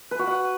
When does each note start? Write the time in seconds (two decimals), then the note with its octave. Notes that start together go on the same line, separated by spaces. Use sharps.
0.11 B4
0.19 F#4
0.27 F#5